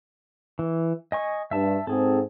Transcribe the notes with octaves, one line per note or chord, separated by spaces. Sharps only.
E3
D#5 G#5 C#6
G2 E5 A5
G#2 C4 G#4 A4